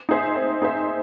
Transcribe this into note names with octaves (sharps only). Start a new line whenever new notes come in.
D#4 G#4 C5 E5
C4
D#4 G#4 C5 E5